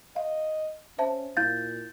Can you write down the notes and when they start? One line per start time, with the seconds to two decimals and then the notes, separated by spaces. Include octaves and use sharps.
0.16 D#5 F5
0.99 C#4 C5 E5 A5
1.37 A#2 E4 F5 G6 A6